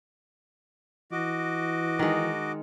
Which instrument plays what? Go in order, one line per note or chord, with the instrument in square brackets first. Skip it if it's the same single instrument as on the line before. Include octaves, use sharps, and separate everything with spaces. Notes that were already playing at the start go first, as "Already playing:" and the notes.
[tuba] E3 [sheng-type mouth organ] F#4 D#5 D6
[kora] D#3 G#3